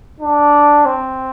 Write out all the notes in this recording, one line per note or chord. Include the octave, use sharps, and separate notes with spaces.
D4
C4